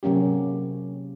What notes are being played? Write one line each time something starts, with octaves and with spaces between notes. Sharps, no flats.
C3 F#3 A#3 C#4 G4